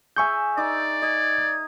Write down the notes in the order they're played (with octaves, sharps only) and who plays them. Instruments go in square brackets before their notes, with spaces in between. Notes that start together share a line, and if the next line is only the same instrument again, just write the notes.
[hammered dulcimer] G#4 E5 [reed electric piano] G#5 C#6 G6
[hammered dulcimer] D#4 D6 [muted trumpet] D5
[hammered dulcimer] D#5 [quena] G#6